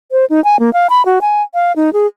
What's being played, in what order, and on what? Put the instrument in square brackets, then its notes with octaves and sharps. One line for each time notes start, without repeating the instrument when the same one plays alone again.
[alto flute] C5
D#4
G#5
A#3
F5
B5
F#4
G#5
F5
D#4
G#4